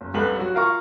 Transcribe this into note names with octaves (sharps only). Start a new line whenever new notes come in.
F#1
C2 G2 G4 A4 B4 F#7
F#3 F#4
F4 A#4 F5 A#5 C#6